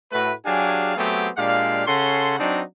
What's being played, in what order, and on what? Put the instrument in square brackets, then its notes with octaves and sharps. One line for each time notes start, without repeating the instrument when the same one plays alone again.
[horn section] A2 A3 F#4 B4
F#3 D4 G4 G#4 F5 G#5
F#3 A3 B3 C4 G4 G#4
A#2 G#3 D4 G4 F5
C#3 C#4 A4 F#5 C6
F#3 C4 D4 D#4